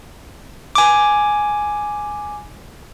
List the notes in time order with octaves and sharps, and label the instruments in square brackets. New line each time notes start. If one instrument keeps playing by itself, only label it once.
[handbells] G#5 D6